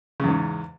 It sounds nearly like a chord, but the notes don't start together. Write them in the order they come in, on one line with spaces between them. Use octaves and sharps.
C#3 E2 G#2